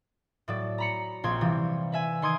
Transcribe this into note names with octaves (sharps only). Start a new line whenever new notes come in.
A2 F#3 D5
A#5 B5 C#7
A#1 A#2 C4 C5 C6 G#6
C3 E3 F3 G3
B4 E5 G#5
D#3 C6 D#6 G#6 D7